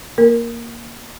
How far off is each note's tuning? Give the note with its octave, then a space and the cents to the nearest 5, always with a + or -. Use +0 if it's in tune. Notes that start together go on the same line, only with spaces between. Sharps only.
A#3 +0 A#4 +5